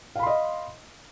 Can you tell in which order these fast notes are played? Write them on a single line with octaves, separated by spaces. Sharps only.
F5 B5 C6 D#5